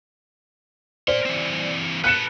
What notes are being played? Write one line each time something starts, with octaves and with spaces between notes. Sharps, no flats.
A#4 C5 D5 C6
E3 C4
A4 B4 F#6 C#7 E7